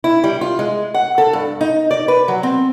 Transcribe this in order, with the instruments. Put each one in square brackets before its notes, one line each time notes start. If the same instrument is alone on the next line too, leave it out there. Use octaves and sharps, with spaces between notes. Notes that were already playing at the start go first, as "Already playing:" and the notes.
[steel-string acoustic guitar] E4
G3
F4
G#3
F#5
A4
G2
D#4
D5
B4
F#3
C4